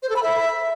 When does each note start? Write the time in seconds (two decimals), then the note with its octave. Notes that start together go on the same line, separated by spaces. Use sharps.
0.03 C5
0.09 A4
0.16 B5
0.23 E5